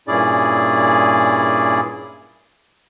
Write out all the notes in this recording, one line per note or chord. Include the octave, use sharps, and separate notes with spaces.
G2 A#2 C#4 E4 G#4 D5